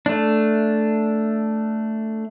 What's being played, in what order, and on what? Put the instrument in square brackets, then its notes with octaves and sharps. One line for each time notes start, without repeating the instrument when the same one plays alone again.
[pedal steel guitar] A3 D4